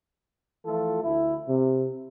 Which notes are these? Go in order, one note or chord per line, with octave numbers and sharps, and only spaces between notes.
E3 F3 A3 F4 A4
D2 E4
C3